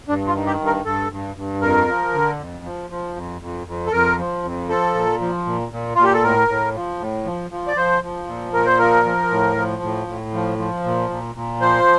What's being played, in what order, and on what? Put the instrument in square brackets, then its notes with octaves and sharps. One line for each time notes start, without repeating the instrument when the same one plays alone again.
[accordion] G2 D4
F4
D#3
G4
G2
A#4
G2 A4
G2
G2
F2 A#4
F3
D3
F2
F3
F3
F2
F2
F2
A4
F2 A#4
F3
F2
F3 A4
A#2
F3
A#2
A#2
A#2 F4
G4
A4
A2 A#4
A2
F3
A2
F3
F3
D5
F3 C5
F3
A#2
A#2 A#4
C5
F3 A#4
F3
A2
F3
A2
A2
F3
F3
A#2
A#2
A#2
F3 C5